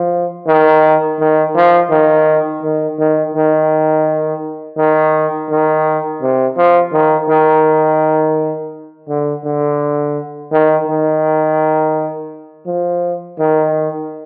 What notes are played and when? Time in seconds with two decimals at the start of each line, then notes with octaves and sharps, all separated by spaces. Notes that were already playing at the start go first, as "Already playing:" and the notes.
Already playing: F3
0.47 D#3
1.20 D#3
1.55 F3
1.90 D#3
2.63 D#3
2.99 D#3
3.34 D#3
4.77 D#3
5.50 D#3
6.22 C3
6.57 F3
6.93 D#3
7.29 D#3
9.09 D3
9.44 D3
10.52 D#3
10.87 D#3
12.66 F3
13.39 D#3